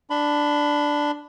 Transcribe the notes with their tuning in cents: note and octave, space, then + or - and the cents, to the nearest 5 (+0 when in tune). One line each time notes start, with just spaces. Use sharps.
D4 +0 B5 +15